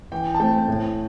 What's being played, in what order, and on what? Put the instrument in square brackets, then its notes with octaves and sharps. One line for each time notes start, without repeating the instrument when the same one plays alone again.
[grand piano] E3 G5
A5
A3 C4 G5
A2